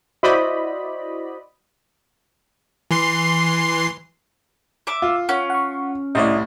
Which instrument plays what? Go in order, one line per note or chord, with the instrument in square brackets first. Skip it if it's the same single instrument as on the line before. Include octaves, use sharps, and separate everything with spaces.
[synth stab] E4 F#4 C5 D5 D#5 B5
[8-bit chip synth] E3 C6 C7
[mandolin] E5 D6
[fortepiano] F4
[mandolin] C#4 [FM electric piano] F#5
[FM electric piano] F#5 C#6
[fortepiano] C2 A2 [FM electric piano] D5 D#5